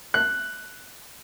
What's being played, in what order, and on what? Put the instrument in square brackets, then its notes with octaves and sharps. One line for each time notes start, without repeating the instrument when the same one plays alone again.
[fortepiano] F#6